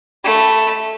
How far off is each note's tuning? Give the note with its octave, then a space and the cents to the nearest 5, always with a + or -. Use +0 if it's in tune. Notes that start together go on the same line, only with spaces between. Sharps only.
A3 +0 B5 -15